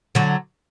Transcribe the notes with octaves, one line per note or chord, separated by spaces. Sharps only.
D3 F#3